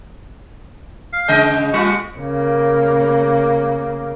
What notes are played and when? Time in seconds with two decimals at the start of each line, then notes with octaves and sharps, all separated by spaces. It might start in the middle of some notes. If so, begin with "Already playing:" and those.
1.13 F5
1.28 C#3 G#3 D#5 G5
1.74 G3 F4 C#6
2.17 C#3 A#3